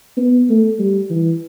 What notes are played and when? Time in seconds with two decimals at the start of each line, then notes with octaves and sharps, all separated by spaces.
0.17 B3
0.49 A3
0.79 G3
1.10 E3